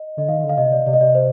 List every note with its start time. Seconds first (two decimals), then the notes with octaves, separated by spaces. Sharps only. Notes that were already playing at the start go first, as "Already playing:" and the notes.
Already playing: D#5
0.17 D3 D#5
0.28 D#3 F5
0.39 D#3
0.44 D3
0.49 F5
0.57 C3 D#5
0.72 D5
0.86 C3 D5
0.93 D#5
1.00 C3 D5
1.15 C5